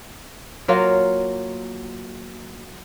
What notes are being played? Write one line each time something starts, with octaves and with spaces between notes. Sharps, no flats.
F#3 A#3 F4